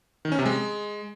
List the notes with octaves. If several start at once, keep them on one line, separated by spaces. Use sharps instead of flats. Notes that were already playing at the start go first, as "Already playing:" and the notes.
D#3
C#4
C3
G#3